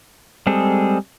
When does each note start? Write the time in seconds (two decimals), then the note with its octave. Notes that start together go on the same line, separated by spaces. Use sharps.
0.47 G3 G#3 C4 G#4 A4